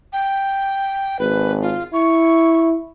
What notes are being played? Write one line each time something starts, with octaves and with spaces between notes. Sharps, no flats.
G5
G#1 B4
F4
E4 C#6